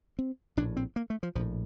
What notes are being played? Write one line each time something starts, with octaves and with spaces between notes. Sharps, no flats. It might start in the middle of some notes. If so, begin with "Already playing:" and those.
C4
A#1 A2 D4
C4
A#3
A3
F3
A#1 A2 F3